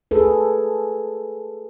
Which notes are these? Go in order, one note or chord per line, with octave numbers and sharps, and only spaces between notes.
G#4 A4 B4